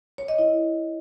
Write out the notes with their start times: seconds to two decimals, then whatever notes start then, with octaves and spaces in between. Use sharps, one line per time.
0.18 C#5
0.28 D#5
0.39 E4